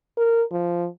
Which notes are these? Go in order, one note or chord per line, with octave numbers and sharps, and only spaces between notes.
A#4
F3